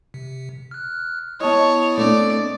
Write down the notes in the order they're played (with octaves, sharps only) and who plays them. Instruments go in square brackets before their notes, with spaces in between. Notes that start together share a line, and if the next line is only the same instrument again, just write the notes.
[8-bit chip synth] C3
F6 F#6
[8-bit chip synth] B3 E4 [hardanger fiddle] C#5 [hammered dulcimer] D#5 A5
[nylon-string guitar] A3 C4 D4 [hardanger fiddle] D5